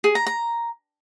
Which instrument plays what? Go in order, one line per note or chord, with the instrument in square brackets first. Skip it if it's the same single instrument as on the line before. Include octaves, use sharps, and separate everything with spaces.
[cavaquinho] G#4
A#5
A#5